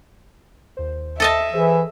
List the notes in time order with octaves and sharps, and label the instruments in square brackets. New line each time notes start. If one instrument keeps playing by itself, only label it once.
[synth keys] D#2 C5
[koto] A4 D#5 A5 [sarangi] E5
[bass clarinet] E3 [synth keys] G#4 C5